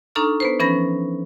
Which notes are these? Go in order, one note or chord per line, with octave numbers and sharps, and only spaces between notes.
D4 D#4 A4 A#5 C#6 F6
B3 B4 C5
E3 F3 C#4 B4 B5 A#6